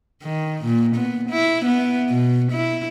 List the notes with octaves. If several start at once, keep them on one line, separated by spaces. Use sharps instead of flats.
D#3
A#2
B3
E4
B3
B2
E4